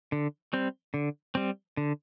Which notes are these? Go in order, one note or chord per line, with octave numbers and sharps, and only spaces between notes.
D3
G3 C4
D3
G3 C4
D3